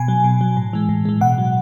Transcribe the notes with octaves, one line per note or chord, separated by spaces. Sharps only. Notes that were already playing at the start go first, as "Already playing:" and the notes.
Already playing: B2 G#5
F#3
B2
F#3
A2
E3 G#3
A2
E3 G#3
B2 F#5
F#3